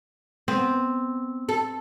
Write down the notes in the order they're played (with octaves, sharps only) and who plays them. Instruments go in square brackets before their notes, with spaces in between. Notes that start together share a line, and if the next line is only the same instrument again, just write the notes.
[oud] B3 [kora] C4
[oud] A4